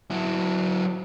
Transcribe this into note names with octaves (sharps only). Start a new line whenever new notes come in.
F#3 E4